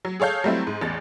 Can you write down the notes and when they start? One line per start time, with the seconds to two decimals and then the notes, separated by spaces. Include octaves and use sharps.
0.05 F#3
0.20 G#4 A4 C#5 F5 G6
0.44 F#3 G3 A3 C4 E4
0.67 G#2
0.81 A1 E2 A6